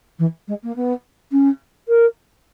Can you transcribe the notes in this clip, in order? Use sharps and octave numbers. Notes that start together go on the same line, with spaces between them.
E3
G#3
A#3
B3
C#4
A#4